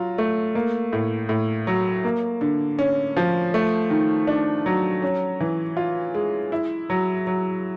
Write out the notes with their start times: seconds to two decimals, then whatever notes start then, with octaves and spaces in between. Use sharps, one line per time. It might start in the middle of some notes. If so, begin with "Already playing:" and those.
Already playing: F#3 F4
0.18 A3
0.55 A#3
0.93 A2
1.29 A2
1.67 F#3
2.04 A#3
2.41 D3
2.79 C#4
3.17 F3
3.54 A3
3.90 D#3
4.27 D4
4.66 F#3
5.02 C#4
5.41 E3
5.77 F4
6.14 G#3
6.52 E4
6.90 F#3
7.27 F#3